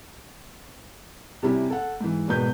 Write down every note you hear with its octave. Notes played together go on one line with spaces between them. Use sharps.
C3 G3 C#4 E4
A4 F#5
G#2 E3
E1 G#2 B2 B4 G6